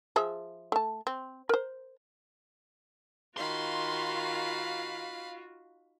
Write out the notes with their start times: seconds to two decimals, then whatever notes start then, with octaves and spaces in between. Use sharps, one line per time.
0.16 F3 G#4 E5
0.72 A3 A5
1.07 C4
1.49 A#4 C5
3.37 D#3 F4 F#4 F5 B5 C6